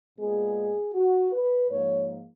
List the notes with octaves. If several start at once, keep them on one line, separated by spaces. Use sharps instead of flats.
A#2 G#3 B3 G#4
F#4
B4
G#2 F3 A#3 C#5